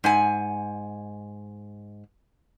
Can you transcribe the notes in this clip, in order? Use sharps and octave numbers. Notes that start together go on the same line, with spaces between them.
G#2 F#5 G#5